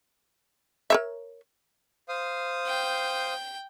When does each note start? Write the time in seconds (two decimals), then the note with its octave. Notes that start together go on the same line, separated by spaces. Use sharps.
0.90 A#4 C#5 E5
2.09 C5 F5 D#6
2.67 G5